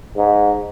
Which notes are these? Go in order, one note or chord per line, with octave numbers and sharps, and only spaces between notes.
G#2